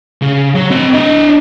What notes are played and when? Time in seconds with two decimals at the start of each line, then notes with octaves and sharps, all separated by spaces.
0.22 C#3
0.55 F#3
0.70 C4 D#5
0.94 D4 D#5